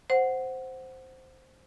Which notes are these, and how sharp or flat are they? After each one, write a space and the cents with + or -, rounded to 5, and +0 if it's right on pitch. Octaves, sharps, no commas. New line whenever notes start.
C5 +0 F#5 +0